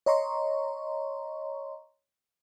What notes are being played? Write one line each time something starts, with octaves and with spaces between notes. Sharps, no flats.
C#5 D#5 A#5 C6 C#6